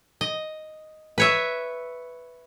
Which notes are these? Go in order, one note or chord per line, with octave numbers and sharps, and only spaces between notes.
D#5
B4 C#5 E5